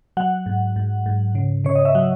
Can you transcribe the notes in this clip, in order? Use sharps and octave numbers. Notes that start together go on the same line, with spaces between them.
F#3 F#5
G#2
G#2
G#2
C#3
C#3 C#5
D#5
E5
F#3 F#5